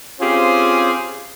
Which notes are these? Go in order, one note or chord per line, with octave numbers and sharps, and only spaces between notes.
C4 C#4 F4 G4 G#4 C5